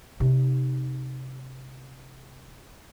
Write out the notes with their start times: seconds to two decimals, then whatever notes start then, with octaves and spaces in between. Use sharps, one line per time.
0.20 C3 D#4